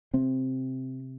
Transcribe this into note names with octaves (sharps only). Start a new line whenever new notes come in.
C3 C4